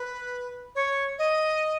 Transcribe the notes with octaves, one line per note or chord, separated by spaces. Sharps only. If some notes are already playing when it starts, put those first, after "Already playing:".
Already playing: B4
C#5
D#5